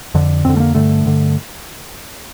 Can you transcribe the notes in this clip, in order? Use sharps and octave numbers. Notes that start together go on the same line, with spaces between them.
F2 D3
F2 D3 C4
A3
A#3
G2 D3 A3
G2 D3